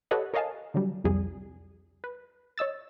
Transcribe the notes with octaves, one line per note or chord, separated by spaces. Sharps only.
G4 A4 B4 C#5 D#5 F#5
A#4 C#5 D#5 F5 G#5 A5
D3 F#3 G3
C2 F2 G3 G#4
B4
C#5 D#5 E6 A6